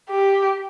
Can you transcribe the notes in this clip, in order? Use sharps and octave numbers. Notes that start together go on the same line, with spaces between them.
G4